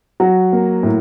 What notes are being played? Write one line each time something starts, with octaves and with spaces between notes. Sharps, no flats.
F#3 F#4
A#3
A2